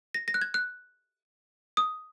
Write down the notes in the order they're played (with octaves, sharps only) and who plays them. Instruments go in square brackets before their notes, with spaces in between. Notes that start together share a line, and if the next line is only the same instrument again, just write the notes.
[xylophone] A#6
A#6
F#6
G#6
F#6
D#6